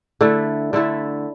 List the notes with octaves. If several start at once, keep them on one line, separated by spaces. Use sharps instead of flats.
D3 A3 E4 A4
D3 A3 E4 A4